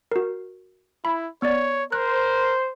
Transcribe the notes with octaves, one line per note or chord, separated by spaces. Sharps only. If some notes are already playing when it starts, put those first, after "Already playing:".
F#4 A#4
E4 B5
B3 C#5 D5
A#4 C5 F#6